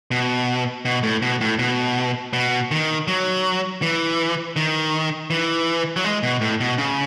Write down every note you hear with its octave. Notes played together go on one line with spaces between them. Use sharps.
B2
B2
A2
B2
A2
B2
B2
D#3
F#3
E3
D#3
E3
F#3
G#3
B2
A2
B2
C#3